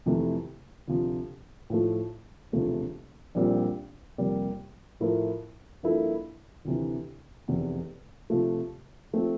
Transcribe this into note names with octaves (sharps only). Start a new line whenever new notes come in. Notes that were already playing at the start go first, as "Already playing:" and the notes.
F2 C3 E3 A3
D2 C3 F3
A2 F3 A3
E1 D2 C3 F3 A3
A#1 A#2 G3 C4 G4
F2 C3 G3 A#3
A2 F3 A3 E4 A#4
G2 F3 A#3 E4 A4
D2 C3 E3
F1 E2 C3
C3 F3 A3
F3 A3 C4